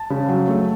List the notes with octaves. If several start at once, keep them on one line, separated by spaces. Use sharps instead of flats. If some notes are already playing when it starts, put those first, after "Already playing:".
Already playing: A5
C#3
F#3
A3